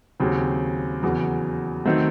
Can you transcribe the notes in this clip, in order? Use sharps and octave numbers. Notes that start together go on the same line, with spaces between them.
D#2 C#3 F#3 C4
E2 C#3 F#3
D#3 F#3 A3 C4